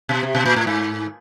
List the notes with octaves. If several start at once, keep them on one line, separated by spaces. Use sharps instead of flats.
B2
C3
B2
A#2
A2
G#2